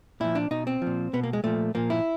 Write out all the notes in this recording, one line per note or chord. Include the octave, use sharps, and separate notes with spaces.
A#2 F3 E4
D4
B2 D#4
C4
A#2 F3
B2 B3
A#3
G#3
A#2 F3 A3
A#2 F3 A#3
E4